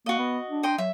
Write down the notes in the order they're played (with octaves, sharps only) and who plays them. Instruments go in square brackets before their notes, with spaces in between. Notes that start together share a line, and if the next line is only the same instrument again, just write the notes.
[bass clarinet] A#3 [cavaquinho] F#4 D#5
[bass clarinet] B3
D4
[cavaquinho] D#5 G5 C6
[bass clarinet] F#3 [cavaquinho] E5